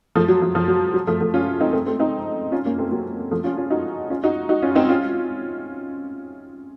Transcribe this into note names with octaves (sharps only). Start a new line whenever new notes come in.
F3 A3
F#3
F3
F3
F#3
F#3
F3 A3
F3 A3
C#4 F4
C4 D#4
A3 C4
A3 C4
C4 D#4
C#4 F4
A#3 C#4
A3 C4
F#3 A#3
F3 A3
C#4 F4
C#4 F4
D#4 F#4
C#4 F4
D#4 F#4
D#4 F#4
C#4 F4
C4 D#4
C#4 F4